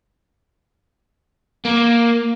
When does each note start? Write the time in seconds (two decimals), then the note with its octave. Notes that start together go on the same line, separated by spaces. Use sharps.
1.65 A#3